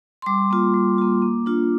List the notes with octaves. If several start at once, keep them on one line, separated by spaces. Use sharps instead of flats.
C6
G3 D6
A#3 F4
G3
A#3 F4
A#3
D4 F4